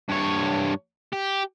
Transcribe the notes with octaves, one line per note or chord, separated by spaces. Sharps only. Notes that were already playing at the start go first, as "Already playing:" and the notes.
G2 C#5
G4